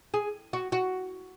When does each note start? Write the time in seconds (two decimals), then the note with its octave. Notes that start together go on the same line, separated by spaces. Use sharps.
0.14 G#4
0.53 F#4
0.72 F#4